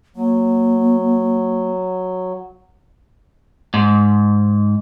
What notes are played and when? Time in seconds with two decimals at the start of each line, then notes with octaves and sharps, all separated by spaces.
0.16 F#3 A#3
3.74 G#2